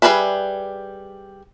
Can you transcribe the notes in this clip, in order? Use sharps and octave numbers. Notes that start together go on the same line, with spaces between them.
G3 G#4 A4 B4 E5